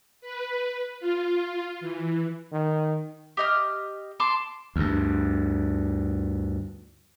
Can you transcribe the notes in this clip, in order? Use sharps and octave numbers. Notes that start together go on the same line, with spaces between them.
B4
F4
E3
D#3
G4 D#5 F6
A5 C6 D6
D2 G2